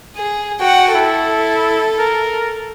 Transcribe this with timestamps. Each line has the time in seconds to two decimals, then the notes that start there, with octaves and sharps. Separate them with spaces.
0.16 G#4
0.60 F#4 F#5 G5
0.95 E4 A4
1.99 A#4